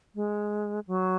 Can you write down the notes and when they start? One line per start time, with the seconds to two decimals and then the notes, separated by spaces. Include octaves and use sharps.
0.15 G#3
0.87 F#3